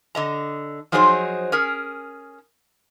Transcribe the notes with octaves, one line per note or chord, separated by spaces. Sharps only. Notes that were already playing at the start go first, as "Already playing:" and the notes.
D3 D#5 A#5
F3 F#3 D#4 G#4 A#4 C5
C#4 G#4 A#4